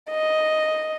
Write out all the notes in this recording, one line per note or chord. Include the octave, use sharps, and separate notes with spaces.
D#5